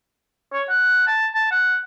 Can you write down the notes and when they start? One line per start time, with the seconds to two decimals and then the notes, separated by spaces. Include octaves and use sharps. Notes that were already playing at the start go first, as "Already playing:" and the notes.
0.53 C#5
0.69 F#5
1.07 A5
1.35 A5
1.51 F#5